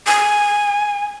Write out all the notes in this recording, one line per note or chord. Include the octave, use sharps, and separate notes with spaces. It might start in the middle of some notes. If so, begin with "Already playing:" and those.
G#5